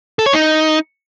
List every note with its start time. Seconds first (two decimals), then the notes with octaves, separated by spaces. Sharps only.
0.19 A4
0.26 C#5
0.33 D#4